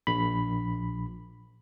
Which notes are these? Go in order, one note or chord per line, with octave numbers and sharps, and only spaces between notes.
A#1 B5